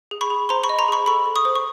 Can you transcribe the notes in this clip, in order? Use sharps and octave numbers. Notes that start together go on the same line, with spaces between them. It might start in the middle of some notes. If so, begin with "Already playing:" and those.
G#4
B5 C#6
G#4
C5 A#5 C6
B5 C#6
D#5
A#5 C6
G#4 B5 C#6
A4 B5 C#6
A4
C#6 D#6
C5
C#6